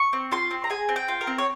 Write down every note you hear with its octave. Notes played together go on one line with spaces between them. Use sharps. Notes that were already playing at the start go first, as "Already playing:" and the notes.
Already playing: C#6
C4
F4 C6
C4
A#5
G#4 G#5
C4
G5
F4
A#4
C4
C#5